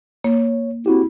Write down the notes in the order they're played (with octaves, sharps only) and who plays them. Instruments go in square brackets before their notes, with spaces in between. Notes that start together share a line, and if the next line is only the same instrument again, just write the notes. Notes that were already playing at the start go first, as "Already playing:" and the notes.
[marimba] A#3 [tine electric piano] C#5
[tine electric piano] C4 F#4 G4 [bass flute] E4